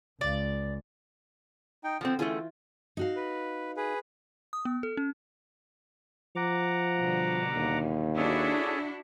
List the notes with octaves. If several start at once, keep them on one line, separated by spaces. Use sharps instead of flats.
C#2 D5
D#4 G5
D3 F3 A#3 C4
E3 A3 C#4 F4 G#4 G5
D#4 F#4 F5
B4
G#4 B4
D#6
B3
A4
C#4
F3 F#5 A#5 D6
B2 D3 G3
D#2
D4 E4 F#4 G#4 A4 C#5